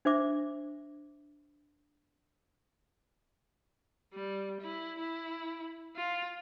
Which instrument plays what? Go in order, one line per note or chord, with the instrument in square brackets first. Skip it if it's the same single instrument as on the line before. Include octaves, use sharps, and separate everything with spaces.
[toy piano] D4 C5 E5 D6
[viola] G3
E4
E4
F4